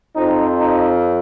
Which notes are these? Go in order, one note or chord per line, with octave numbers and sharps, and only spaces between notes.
F2 F3 C4 D#4
D#4